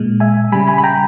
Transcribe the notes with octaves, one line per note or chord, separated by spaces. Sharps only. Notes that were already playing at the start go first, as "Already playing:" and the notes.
Already playing: A#2 G#3
E5 G#5
C#3 G3 G#5 B5
G#5 B5
B5
G5 A#5